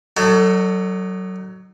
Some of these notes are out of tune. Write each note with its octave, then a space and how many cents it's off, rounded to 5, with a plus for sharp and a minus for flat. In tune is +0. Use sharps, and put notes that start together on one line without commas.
F#3 +20 D#4 -30 A4 +30